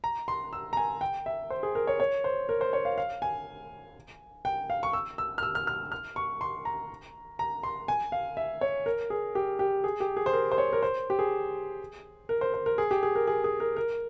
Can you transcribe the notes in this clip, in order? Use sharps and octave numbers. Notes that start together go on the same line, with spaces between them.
A#5
C6
E6
A#5
G#5
G5
E5
C5
G#4
A#4
C#5
C#5
C5
A#4
C5
C#5
F5
F5
G#5
G5
F5
C#6
E6
E6
F6
E6
F6
F6
F6
C#6
C6
A#5
A#5
C6
G#5
F5
E5
C#5
A#4
G#4
G4
G4
G#4
G4
G#4
C5
A#4
C5
C#5
A#4
C5
G4
G#4
A#4
C5
C5
A#4
G#4
G4
G#4
A#4
G#4
G#4
A#4
A#4